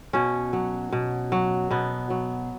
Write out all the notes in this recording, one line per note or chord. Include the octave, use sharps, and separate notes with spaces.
B2 C#4
F#3
B2
F#3
B2 B3
F#3